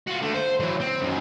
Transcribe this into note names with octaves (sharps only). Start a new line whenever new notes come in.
F4 F#4
D3 A3
C5
E3 F#3
C4
F#2 D#3